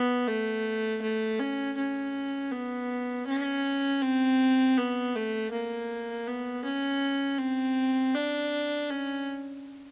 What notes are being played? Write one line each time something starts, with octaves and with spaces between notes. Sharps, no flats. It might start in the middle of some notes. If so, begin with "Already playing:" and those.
Already playing: B3
A3
A3
C#4
C#4
B3
C#4
C4
B3
A3
A#3
B3
C#4
C4
D4
C#4